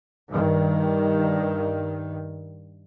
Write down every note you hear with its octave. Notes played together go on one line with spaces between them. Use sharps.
G2 D#3